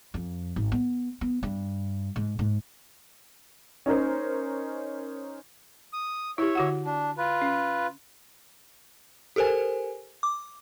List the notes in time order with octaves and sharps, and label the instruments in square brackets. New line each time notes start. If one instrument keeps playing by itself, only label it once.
[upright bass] F2
G#1
B3
B3
G2
G#2
G#2
[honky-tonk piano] C#4 D#4 A#4 C5
[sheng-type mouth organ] D#6
[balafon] E4 G4 [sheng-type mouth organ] C#5 E5
[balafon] D3 F#4 F#5
[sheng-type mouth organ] D4
F4 B4
[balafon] C#4
[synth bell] G4 A4 A#4 C5 G#5
D6